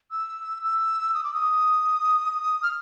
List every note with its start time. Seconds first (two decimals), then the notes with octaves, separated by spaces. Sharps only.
0.11 E6
0.63 E6
1.14 D#6
1.24 D6
1.34 D#6
2.63 F6